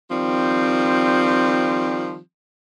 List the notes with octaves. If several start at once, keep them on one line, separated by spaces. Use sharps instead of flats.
D#3 F3 G3 C4